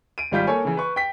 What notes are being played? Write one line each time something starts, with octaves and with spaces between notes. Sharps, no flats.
D7 D#7
G#1 G3 F4 G6 B6
A#3 A4 C#5 G#5
C#3 E3
B4 C#6
G5 B6